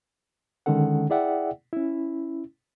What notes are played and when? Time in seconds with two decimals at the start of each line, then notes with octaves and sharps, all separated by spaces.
0.66 D3 D#3 G#3 C#4 A4 F#5
1.10 E4 G#4 D5 E5 F#5 G5
1.73 C#4 E4